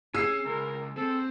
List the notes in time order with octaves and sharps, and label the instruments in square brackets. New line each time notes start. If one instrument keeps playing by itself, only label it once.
[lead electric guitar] C#4 [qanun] G#4 [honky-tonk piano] E6 C7
[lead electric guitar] C#2 [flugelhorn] A#4
[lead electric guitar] C4 [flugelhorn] A4